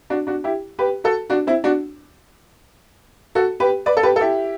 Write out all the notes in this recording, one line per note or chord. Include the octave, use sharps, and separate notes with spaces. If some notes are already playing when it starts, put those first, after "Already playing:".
D4 F#4
D4 F#4
E4 G4
G4 B4
F#4 A4
D4 F#4
C4 E4
D4 F#4
F#4 A4
G4 B4
B4 D5
A4
G4 B4
A4
E4 G4